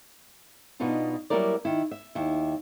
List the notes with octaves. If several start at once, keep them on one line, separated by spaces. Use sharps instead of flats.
B2 B3 D4 D#4 F4
F#3 G3 A#3 E4 A#4 D5
D#3 E4
E5
D#2 E4